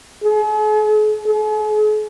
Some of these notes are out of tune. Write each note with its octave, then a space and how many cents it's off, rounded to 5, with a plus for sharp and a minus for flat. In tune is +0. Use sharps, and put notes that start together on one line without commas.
G#4 +45
G#4 +45